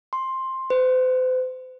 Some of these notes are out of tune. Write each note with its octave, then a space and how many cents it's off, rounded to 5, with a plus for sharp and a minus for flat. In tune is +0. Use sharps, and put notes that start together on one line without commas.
C6 +10
C5 -40